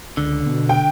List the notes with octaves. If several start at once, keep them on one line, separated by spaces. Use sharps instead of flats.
C#2 D3
B2
G5